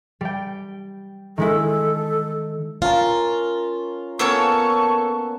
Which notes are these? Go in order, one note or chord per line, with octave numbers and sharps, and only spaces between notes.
G3 G5
D#3 G#3 E4 A4
C#4 F4 A#4 A5
A#3 B3 C#4 A4 A#4 C#5 C#6